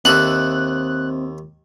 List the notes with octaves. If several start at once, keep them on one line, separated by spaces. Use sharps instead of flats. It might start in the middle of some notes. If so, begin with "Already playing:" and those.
D#2 C4 D#4 A4 E5 F#6